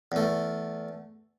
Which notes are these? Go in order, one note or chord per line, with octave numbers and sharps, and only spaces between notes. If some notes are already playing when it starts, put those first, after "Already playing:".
E2 A3